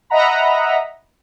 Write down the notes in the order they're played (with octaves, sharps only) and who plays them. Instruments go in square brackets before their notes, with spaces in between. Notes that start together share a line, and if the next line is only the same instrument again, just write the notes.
[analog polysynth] D#5 E5 F#5 A#5 B5